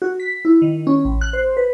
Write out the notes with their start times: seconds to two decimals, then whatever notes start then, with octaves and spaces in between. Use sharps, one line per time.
0.02 F#4
0.20 B6
0.45 E4
0.62 D#3
0.87 C#4
1.05 A1
1.21 F#6
1.33 C5
1.57 B4